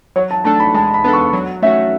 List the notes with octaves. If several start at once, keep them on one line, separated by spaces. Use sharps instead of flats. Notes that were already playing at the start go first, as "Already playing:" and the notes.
F#3 C#5
A5
A3 D4 A4 A5
B5
G#3 A5
B5
B3 D4 A4
C#6
F#3
A3 C#4 F#4 E5